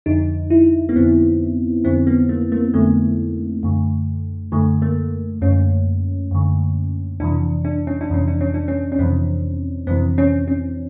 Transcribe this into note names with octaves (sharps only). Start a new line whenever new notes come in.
F2 D3 D#4
E4
B3
F2 D3 C4
F2 D3 C4
B3
A#3
A#3
F2 D3 A3
F#2 D3
F#2 D3 A3
A#3
F#2 D3 C#4
F#2 D3
F2 C3 E3 D4
D4
C#4
D4
F2 C3 E3 C#4
D4
C#4
D4
C#4
C#4
F2 C3 E3 C4
F2 C3 E3 C4
C#4
C#4